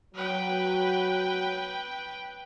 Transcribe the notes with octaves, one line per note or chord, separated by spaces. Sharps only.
F#3 B4 G5